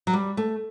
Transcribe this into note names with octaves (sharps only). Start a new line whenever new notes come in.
F#3
G3
A3